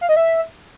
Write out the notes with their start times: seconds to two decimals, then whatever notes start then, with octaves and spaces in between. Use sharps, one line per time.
0.01 F5
0.09 D#5
0.16 E5